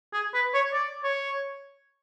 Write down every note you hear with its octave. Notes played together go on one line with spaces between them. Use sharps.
G#4
B4
C#5
D5
C#5